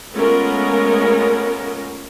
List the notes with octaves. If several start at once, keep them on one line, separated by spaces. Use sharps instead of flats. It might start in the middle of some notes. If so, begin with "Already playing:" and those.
G#3 A3 B3 C#4 F4 A#4